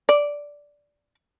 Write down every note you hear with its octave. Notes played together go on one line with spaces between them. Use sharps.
D5